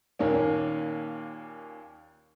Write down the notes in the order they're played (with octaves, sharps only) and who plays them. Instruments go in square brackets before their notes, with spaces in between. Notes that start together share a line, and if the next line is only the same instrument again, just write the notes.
[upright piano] D#2 A#2 D#3 A#3 C#4